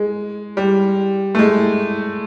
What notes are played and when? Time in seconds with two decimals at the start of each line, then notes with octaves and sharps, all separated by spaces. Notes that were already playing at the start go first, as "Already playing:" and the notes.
Already playing: G#3
0.57 G3
1.35 A3
1.39 G#3